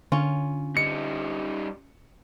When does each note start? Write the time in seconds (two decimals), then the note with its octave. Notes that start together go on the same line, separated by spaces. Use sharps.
0.12 D3 C#4 F4
0.77 G3 D#4 C#7